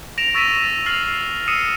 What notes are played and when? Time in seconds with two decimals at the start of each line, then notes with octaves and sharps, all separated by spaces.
0.18 A#6 D7 E7 F7
0.34 C#6 E6 A6 B6 D#7 E7
0.86 F6 A6 C7 F7 F#7
1.48 D#6 E6 C7 C#7 D#7 E7